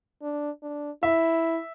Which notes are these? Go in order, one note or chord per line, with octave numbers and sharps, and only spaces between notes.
D4
D4
E4 E5